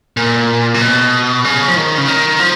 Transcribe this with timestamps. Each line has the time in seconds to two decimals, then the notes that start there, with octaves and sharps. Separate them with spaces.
0.17 A#2
0.74 C#3
0.81 B2
1.44 C#3
1.68 F3
1.76 D#3
1.98 C#3
2.08 D#3
2.40 F3